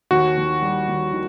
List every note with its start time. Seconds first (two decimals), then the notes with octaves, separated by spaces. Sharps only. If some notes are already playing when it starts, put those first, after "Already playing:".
0.11 D#2 F#4
0.37 D#2
0.62 G3
0.88 D#2
1.12 D#3